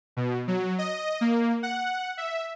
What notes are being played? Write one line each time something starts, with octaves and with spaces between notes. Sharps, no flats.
B2
F#3
D#5
A#3
F#5
E5